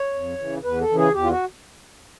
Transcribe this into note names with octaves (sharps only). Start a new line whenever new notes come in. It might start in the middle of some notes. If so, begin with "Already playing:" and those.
Already playing: C#5
F2
C#3 E3
E2 B4
A4
C#3 E3
G#4
E2 G4
F4
F#4